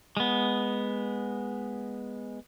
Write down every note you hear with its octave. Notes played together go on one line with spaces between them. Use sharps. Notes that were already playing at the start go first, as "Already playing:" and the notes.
G#3 B3